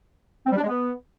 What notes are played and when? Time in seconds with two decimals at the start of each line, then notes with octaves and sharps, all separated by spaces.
0.46 C4
0.52 G3
0.57 D4
0.63 G#3
0.68 B3